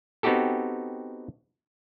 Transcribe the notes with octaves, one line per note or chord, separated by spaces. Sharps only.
B3 C4 D#4 F#4 G4 A4